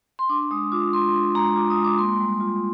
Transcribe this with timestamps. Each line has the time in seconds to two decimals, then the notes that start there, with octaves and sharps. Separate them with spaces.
0.19 C6
0.29 D4 D6
0.51 G#3 D#6
0.72 F4 D6
0.93 G#3 C6
1.14 D4
1.35 G#3 A#5
1.56 F4 D6
1.70 D#6
1.77 G#3
1.84 D6
1.98 A#3 C6
2.20 G3
2.41 F4